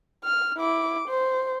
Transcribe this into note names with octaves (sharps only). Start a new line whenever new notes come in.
F6
E4 D6
C5